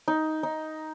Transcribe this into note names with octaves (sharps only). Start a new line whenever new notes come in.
D#4
D#4